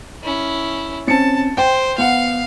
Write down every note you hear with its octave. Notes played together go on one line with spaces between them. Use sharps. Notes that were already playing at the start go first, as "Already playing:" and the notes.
C#4 E4
C4 C#4 A5 C#7
C5 G5
B3 F5 F#5